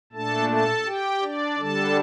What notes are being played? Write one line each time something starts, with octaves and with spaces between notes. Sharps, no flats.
A#2 A3 D4 A4 A5
A4 A5
G4 G5
D4 D5
D3 G3 D4 A4 A5